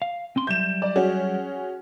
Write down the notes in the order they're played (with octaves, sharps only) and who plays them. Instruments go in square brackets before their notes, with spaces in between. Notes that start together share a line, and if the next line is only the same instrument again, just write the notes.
[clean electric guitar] F5
C4 C#4 C6
[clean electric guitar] F#3 G3 E5 [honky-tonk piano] G6 E7
[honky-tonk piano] D5
C#4 F#4 G#4